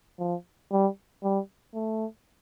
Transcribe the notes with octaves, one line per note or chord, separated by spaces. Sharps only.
F3
G3
G3
A3